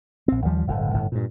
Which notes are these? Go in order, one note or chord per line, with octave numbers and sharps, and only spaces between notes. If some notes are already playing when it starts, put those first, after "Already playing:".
A#1 C4
D#2 F3 G3
D1 G1 A2 D3
G1 A2
G2 A#2